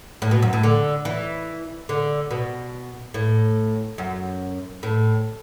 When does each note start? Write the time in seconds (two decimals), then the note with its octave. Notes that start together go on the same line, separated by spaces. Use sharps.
0.22 A2
0.31 B2
0.42 F#2
0.53 A2
0.63 D3
1.05 E3
1.89 D3
2.31 B2
3.14 A2
3.98 F#2
4.83 A2